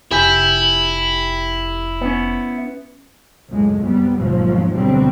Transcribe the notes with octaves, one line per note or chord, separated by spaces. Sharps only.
F1 E4 G4 G#5
B3 C#4
C#2 F#2 A2 G#3
F#2 C3 G3 B3
G#1 D#2 G#2 B2 F3 F#3
D2 B2 F#3 G3 C4